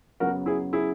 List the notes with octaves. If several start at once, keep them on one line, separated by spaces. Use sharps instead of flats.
F#2 C#3 F#3 B3 F#4 A#4
E4 G#4
E4 G#4